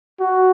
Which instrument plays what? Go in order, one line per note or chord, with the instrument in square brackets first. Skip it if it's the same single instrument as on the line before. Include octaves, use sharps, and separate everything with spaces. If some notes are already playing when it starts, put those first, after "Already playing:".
[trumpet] F#4